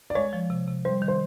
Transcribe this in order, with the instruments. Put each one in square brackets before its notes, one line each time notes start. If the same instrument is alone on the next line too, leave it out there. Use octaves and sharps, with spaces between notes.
[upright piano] D5
[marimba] G#3 [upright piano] C#5
[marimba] F3
C3
C3
[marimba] G3 [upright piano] C5
[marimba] D#3
[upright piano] C5